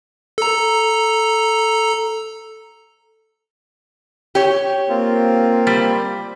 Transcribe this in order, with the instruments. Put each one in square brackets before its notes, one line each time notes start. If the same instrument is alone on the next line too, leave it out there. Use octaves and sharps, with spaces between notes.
[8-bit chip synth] A4 A#5
[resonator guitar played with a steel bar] G4 C#5
[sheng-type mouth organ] A#3 C4 F4
[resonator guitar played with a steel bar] G3